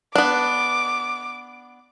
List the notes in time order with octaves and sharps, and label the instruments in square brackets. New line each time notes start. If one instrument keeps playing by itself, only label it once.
[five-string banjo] B3 D4 [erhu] D6